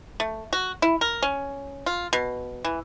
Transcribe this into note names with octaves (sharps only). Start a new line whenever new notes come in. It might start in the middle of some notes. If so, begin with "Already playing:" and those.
A3
F#4
E4
A#4
C#4
F4
B2
E3